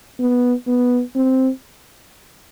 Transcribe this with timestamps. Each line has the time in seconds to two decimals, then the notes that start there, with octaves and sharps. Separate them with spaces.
0.20 B3
0.67 B3
1.16 C4